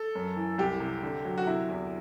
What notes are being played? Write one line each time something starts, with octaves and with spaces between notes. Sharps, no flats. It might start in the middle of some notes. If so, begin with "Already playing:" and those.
Already playing: A4
F#2
E3
C2 G4
C3
D3
F#3
F#4
C3 E4
E2